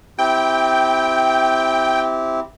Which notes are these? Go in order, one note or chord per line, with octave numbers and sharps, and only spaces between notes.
C4 E4 G4 G5